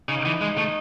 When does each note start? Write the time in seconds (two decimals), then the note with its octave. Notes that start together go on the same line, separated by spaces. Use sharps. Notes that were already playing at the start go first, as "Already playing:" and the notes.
0.09 C#3 D#4
0.26 E3
0.42 G#3
0.58 A3